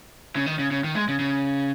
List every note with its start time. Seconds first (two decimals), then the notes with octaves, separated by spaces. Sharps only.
0.36 C#3
0.46 D#3
0.59 C#3
0.71 C#3
0.84 D#3
0.95 G#3
1.08 C#3
1.19 C#3